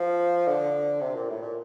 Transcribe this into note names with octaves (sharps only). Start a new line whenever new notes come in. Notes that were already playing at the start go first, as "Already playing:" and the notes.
Already playing: F3
D3
C3
A#2
A2
A#2